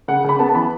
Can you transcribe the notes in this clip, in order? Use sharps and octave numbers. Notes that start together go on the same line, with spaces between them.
C#3 F#5
C#3 B5
B3 A5
A5
E3 B5